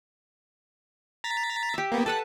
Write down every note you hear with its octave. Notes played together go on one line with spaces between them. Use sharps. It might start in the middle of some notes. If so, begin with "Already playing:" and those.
A#5 A6 B6
G4 E5
A#3 B3
A4 B4 F#5 A5